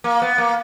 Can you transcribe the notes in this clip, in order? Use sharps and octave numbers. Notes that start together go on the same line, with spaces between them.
A#3
B3
A#3